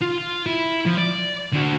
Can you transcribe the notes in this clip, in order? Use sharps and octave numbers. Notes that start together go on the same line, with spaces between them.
F4
E4
F3
D5
D3 F#4